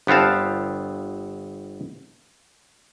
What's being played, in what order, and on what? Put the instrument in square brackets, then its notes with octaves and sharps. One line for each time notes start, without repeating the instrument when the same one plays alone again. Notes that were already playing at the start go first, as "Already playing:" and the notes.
[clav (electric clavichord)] G1 B3 C4 F5 A5